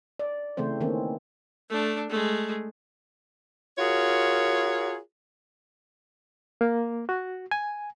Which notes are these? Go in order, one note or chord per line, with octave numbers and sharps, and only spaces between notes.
D5
C#3 E3 A3 C4 C5
D#3 E3 A#3 C4 C#4
A3 D4
G#3 A3
F4 F#4 G#4 A#4 C#5
A#3
F#4
G#5